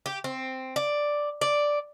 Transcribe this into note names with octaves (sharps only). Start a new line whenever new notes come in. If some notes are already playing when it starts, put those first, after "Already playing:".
G4
C4
D5
D5